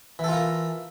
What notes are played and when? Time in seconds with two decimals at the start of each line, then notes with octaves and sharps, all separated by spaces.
0.19 E3
0.24 A4
0.28 F4
0.33 A#4